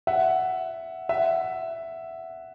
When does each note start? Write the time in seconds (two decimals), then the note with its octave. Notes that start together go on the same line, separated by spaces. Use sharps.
0.07 E5 F#5
1.09 E5 F#5